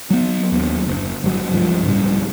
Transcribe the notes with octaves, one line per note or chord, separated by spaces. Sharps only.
F#3 B3
D#2 F#3
F#1
G1 F#3
C#2 G2 F3
C#2 A2 G3